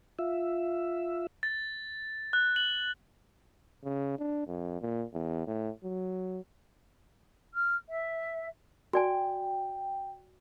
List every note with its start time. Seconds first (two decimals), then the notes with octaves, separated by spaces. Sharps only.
0.19 F4 E5
1.43 A6
2.33 F#6
2.56 F#7
3.84 C#3
4.19 D4
4.47 F2
4.81 A#2
5.13 E2
5.47 A2
5.84 F#3
7.53 F6
7.89 E5
8.93 F#4 D5 G5 G#5